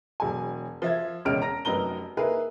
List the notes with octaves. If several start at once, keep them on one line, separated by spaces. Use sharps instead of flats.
E1 F#3 G#5
F3 E5 G#6
E1 C#2 C#4 C#5 F6 D7
A#5 A#6
F1 F#2 D#4 B4 A#5 G7
A#3 D#4 E4 G#4 A#4 B4